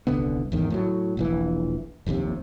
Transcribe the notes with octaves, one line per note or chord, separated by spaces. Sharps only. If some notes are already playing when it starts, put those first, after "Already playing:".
D#1 C2 D3 B3
G#1 E2 D#3
A2 F3 F#3
E1 A#1 E3
F1 A#1 D#2 C3